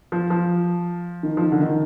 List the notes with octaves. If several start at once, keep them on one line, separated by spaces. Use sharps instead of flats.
F3
F3
D#3
F3
D#3
D3
D#3